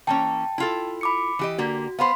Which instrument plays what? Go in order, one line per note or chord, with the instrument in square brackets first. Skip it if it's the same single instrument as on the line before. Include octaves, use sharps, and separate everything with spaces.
[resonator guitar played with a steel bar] E3 A#3 C#4 [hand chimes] G5 A5
[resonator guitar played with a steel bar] E4 F4 A4
[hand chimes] B5 D6 C#7
[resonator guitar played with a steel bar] E3 G4 D#5
[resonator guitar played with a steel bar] D3 A#3 G4 [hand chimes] F#4
[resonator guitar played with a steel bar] B3 C5 [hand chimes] F5 B5 C6